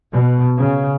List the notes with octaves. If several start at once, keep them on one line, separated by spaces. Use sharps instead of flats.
B2
C#3